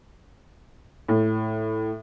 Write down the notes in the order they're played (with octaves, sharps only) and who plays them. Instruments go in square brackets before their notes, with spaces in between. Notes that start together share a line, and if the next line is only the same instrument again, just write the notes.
[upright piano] A2